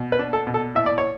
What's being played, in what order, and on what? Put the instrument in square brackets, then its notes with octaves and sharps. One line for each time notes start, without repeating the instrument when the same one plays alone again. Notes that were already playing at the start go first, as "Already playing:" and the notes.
Already playing: [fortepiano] B2
B4
D4
A4
B2
A4
A2 E5
D5
C#5